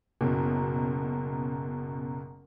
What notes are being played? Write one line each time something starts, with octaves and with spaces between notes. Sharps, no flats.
F#1 F#2 B2